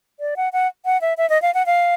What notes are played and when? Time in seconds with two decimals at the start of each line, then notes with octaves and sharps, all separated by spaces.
0.20 D5
0.37 F#5
0.53 F#5
0.85 F#5
1.01 E5
1.18 E5
1.30 D#5
1.42 F5
1.54 F#5
1.66 F5